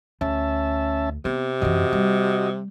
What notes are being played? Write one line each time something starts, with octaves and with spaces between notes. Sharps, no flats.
D2 C#4 E5 A5
C3 B3
F#2 E3 F#4 D#5
G3